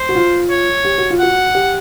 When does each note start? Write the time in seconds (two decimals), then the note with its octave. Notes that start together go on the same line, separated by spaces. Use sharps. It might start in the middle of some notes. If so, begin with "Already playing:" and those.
Already playing: C5
0.09 F#4
0.15 F4
0.50 C#5
0.85 G4
0.98 F#4
1.10 F4
1.19 F#4 F#5
1.55 G4